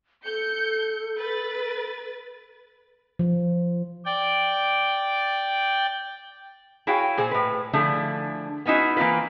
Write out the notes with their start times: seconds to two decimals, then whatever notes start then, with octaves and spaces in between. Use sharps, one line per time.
0.25 A4 G6 C#7
1.18 B4 A6
3.19 F3
4.05 D5 G5
6.87 E4 F#4 G#4 C#5 F5 G5
7.17 A#2 G#4 C5
7.31 A2 B4
7.73 D3 F3 A3 D4 E4 G#4
8.66 B3 C#4 D#4 E4 F#4
8.97 E3 A#3 C4 F4 B4